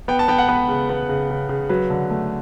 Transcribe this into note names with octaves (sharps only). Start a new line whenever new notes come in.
B3 G5
A5
B3 G5
F#5
B3 B4
C#3
B3
C#3
C#3
C#3
F#3 B4
D3
A3